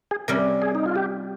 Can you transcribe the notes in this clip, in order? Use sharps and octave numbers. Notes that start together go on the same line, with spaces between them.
G#4
C3 G3 C#4 A#4
G#4
D#4
F4
G4